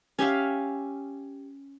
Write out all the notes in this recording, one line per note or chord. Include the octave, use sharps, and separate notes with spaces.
C#4 G4 E5 F5